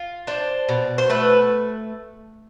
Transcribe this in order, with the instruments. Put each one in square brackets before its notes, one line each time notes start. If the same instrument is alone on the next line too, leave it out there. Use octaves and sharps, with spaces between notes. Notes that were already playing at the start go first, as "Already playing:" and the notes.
Already playing: [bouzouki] F4
D4 C5
B2
C5
A3 B4